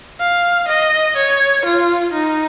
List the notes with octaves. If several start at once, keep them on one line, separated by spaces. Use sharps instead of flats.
F5
D#5
C#5
F4
D#4